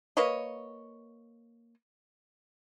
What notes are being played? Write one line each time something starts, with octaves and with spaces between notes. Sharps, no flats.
A#3 B4 C#5 D#5